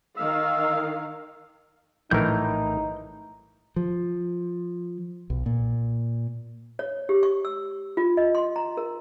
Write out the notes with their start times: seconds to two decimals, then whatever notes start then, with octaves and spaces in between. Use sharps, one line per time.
0.17 D#3 F5 E6
2.11 A#1 A2 E3 D#4 A#4 A#5 G6
3.76 F3
5.30 B1
5.46 A#2
6.79 C#5
7.09 G4
7.23 C#6
7.45 E6
7.97 F4
8.17 D#5
8.35 C6
8.56 A#5
8.77 A#4